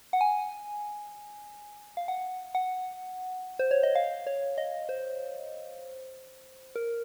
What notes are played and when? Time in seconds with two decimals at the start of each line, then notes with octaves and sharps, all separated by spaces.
0.13 F#5
0.21 G#5
1.97 F5
2.08 F#5
2.55 F#5
3.59 C5
3.71 C#5
3.83 D#5
3.95 F5
4.27 C#5
4.58 D#5
4.89 C5
6.76 A#4